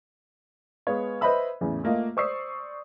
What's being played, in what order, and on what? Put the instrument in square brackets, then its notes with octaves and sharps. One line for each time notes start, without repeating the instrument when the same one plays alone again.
[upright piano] G#3 B3 G#4 C#5 F5
B4 C5 D#5 E5 B5 E6
E2 A2 C#3
A3 A#3 F4 D#5 F5
C5 D5 C#6 D#6 E6 C7